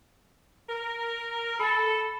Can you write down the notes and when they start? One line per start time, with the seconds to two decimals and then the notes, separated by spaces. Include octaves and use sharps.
0.70 A#4
1.60 A4 B5 A6